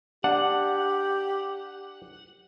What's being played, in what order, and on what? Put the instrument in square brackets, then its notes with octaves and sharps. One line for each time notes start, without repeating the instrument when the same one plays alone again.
[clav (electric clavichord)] D4 [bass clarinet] G4 [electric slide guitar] F#5